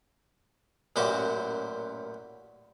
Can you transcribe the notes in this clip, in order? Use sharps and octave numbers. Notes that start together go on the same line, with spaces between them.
A1 F#2 A#2 F#4 G4 D6